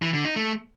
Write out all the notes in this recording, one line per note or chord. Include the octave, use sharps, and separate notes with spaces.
E3
D3
D#4
A3